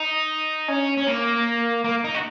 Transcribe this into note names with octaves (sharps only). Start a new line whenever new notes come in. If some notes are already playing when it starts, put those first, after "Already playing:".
Already playing: D#4
C#4
C#4
A#3
A#3
D#4
F#4